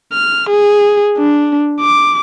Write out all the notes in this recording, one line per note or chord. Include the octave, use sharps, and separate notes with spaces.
F6
G#4
D4
D6